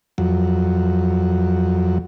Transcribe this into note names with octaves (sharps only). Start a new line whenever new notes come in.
F2 F#3